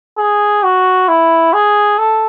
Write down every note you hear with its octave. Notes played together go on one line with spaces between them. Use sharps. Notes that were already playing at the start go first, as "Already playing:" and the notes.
G#4
F#4
E4
G#4
A4